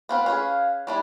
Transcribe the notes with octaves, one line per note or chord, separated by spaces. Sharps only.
B3 C4 B4 F5
C#4 G#4 B4
G3 D4 E4